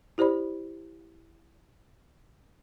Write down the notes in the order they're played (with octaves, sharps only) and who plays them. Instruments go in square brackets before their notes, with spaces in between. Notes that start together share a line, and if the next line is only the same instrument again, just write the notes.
[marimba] E4 G4 C5 D5 B5